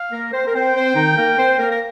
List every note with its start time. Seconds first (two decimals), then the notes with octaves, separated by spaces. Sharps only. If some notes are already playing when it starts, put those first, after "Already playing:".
Already playing: F5
0.11 A#3 A#4
0.32 C4 C5
0.46 A#4
0.54 C4 C5 G5
0.74 C4 C5
0.95 D#3 D#4
1.17 A#3 A#4
1.38 C4 C5
1.58 A#3 A#4
1.71 A#4